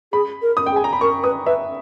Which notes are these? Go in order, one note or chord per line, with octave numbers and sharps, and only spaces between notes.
G#4 B5
A#4
D#6
G5
G#4
G#5
A#5
B5
A#4 C#6
B4 D#6
B4 E5